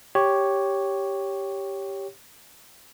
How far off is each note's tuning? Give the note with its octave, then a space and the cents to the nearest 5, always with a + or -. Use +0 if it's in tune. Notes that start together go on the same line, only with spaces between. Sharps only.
G4 +0 C#5 +0